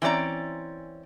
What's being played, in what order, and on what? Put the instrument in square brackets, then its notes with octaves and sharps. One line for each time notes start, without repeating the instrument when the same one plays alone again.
[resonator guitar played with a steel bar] E3 C4 C#4 D5 A#5